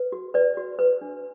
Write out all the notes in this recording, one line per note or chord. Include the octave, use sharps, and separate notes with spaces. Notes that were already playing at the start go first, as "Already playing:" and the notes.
Already playing: B4
F#4
B4 D5
F#4
B4
D4